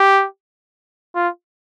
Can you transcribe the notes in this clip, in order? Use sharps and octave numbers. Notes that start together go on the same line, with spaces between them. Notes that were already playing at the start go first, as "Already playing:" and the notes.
Already playing: G4
F4